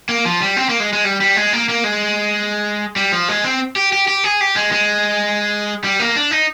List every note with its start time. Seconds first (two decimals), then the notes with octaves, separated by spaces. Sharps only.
0.09 A#3
0.25 F3
0.41 G3
0.57 C4
0.69 A#3
0.80 G#3
0.93 G#3
1.04 G3
1.21 G3
1.36 G#3
1.53 A#3
1.69 A#3
1.84 G#3
2.96 G3
3.12 F3
3.29 G#3
3.44 C4
3.76 G4
3.93 G4
4.08 G4
4.24 G#4
4.41 G4
4.56 G#3
4.72 G#3
5.84 G3
6.00 A#3
6.16 D4
6.31 D#4